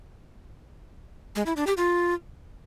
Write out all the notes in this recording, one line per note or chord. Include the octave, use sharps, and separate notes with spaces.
G#3
E4
D4
G4
F4